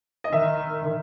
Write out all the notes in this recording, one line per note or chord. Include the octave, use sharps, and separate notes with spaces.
D#5
D#3 E5